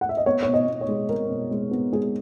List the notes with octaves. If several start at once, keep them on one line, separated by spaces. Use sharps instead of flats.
F#5
E5
D#5
B3 C#5
B2 C#5
D#5
B2
C#5
G#3
G#3 A#4
B2
G#3
B3
G#3 G#4